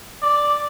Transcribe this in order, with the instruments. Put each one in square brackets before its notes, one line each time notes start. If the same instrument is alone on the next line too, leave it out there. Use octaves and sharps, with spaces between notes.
[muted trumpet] D5